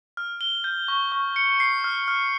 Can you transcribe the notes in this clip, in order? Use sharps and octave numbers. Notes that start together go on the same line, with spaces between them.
F6
G7
G6
C#6
C#6
C#7
C7
F6
F6